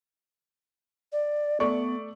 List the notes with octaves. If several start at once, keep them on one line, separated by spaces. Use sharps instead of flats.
D5
A3 B3 D5 C#6